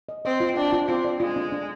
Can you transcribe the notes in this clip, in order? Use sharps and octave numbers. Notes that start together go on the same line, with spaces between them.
D#5
C4 D#5
F4
D4 G5
F4
C4 F4
D5
G#3 F4
D4
D4